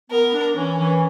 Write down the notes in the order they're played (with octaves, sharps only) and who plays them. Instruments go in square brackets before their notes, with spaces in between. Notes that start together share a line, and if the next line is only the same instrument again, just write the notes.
[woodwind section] B3 [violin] A#4
[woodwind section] D4
[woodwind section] E3 [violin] C#4
[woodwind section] E3